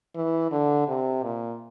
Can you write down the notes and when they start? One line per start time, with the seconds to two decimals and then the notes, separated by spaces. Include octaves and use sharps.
0.15 E3
0.51 D3
0.88 C3
1.24 A#2